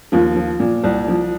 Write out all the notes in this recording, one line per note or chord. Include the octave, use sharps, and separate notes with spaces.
D#2 F3 F4
F3
A#2
C2
F3